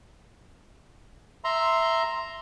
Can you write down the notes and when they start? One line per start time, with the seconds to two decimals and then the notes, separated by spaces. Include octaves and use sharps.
1.44 E5 A#5 C6